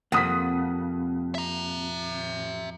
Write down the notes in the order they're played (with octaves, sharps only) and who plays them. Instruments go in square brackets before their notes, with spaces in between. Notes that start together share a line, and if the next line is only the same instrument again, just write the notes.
[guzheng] F2 [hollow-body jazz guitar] C3 A#3 [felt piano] F#5 D#6 B6
[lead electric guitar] E5 A#5